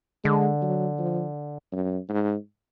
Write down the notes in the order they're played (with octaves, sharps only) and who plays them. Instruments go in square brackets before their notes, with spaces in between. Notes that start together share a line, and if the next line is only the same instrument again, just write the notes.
[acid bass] D3 [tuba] G#3
[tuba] F#3
F3
F#2
G#2